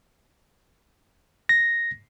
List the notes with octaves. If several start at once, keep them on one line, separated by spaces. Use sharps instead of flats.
A#6